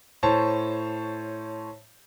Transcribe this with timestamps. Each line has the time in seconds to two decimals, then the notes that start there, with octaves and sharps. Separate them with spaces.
0.23 A2 C5 C#5 A5